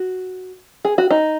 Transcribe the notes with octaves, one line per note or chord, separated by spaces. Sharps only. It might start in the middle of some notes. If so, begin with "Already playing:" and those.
Already playing: F#4
G#4
F#4
D#4